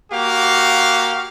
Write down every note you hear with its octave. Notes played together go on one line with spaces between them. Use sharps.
A#3 F#4 G4 F5